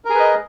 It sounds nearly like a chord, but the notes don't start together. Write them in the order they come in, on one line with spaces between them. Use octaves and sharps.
A#4 G#4 B4 D#5